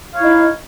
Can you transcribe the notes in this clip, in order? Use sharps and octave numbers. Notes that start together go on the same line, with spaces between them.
D#4 E4 C#5 F5